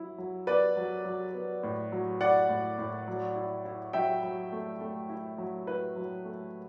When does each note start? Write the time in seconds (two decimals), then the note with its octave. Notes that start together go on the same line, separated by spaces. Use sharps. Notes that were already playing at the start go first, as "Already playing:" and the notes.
Already playing: F#3 E4
0.18 F#3
0.47 B3 B4 D5
0.77 F#3
1.05 F#3
1.34 B3
1.63 A2
1.92 F#3
2.20 E4 D5 F#5
2.49 A2
2.78 A2
3.08 F#3
3.36 E4
3.65 E4
3.93 F#3 E5 G5
4.23 F#3
4.52 A3
4.80 A3
5.09 E4
5.38 F#3
5.67 E4 B4
5.96 F#3
6.25 A3